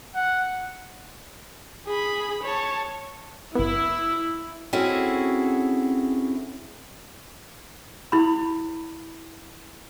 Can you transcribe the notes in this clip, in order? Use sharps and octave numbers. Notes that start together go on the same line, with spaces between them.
F#5
G#4 B5
C#5 A5
G1 B3 E4
C4 C#4 E4 F#4 G#4 A4
E4 B5